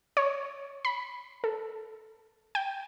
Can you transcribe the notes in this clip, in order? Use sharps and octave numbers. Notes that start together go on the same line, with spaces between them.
C#5
B5
A4
G5